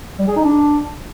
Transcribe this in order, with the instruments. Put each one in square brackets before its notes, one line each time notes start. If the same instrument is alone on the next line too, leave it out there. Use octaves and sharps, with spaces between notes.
[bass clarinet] G3
G#4
D#4
D4